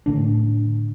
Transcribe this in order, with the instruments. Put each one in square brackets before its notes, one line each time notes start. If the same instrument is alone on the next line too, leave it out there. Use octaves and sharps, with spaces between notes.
[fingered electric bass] A2 D3 D4